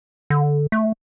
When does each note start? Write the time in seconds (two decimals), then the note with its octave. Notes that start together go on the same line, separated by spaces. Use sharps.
0.30 D3
0.72 A3